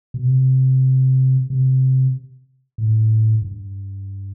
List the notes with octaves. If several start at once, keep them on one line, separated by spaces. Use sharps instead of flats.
B2
C3
C3
A2
G2